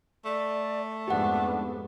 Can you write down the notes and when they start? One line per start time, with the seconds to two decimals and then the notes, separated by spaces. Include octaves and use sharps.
0.25 A3 D5
1.08 F2 G#2 B3 D4 G4 F#5